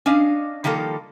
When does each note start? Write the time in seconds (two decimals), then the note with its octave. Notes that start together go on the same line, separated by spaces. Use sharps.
0.06 C#4 D4 D#5 F5
0.64 D#3 F3 G3 A#3 A4